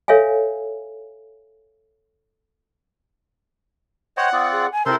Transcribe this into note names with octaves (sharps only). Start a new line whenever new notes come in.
A4 C#5 E5 F5 G#5
C5 C#5 D#5 F#5 G5
C4 F4 D5 D#6
G#4
G#5
C3 C4 E4 A4 A#4 C5 C6